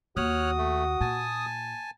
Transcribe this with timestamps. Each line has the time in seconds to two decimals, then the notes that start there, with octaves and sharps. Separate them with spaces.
0.17 D#2 F#4 C#5 D#6 F6 F#6
0.58 A3
1.01 A#2 G#5 A5